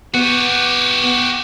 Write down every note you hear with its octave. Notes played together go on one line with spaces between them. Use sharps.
B3 F#4 G4